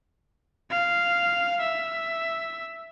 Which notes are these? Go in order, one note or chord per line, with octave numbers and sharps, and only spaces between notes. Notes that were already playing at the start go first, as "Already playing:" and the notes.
F5
E5